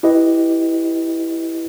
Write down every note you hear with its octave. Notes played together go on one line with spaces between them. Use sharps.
E4 G4 B4 D#5